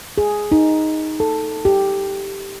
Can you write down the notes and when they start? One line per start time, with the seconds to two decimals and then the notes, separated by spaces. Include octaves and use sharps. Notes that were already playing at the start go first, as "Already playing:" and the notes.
0.18 G#4
0.52 D#4
1.20 A4
1.65 G4